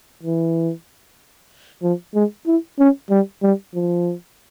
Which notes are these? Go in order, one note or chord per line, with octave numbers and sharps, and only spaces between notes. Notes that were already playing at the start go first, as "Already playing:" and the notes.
E3
F3
G#3
E4
C#4
G3
G3
F3